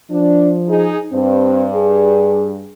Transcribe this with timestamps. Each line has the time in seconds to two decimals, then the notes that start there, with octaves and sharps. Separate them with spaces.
0.11 F3 D4
0.68 D#4 G#4
1.13 G2 C4
1.75 G#4